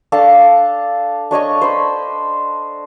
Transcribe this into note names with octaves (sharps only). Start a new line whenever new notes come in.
D4 A4 F5 A5
D4 C#5 D#5 C#6
C5 B5